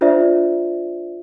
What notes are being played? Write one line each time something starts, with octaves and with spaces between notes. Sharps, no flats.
D4 F4 C5 D5 E5